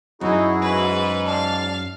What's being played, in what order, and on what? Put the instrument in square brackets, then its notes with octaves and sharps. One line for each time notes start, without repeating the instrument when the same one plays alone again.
[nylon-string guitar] F#2 [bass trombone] D#4 [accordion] E4 F#4 G#4
[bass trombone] G#2 [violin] B4
[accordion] D5 A5 [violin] F5